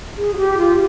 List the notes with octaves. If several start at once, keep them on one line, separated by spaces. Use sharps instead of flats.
G#4
F#4
G4
F4